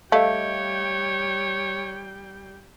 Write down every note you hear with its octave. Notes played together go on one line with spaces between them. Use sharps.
G3 A3 C#5 D#5 F5 G5